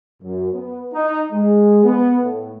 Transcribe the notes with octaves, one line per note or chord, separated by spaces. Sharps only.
F#2
B3
D#4
G#3
B3
A2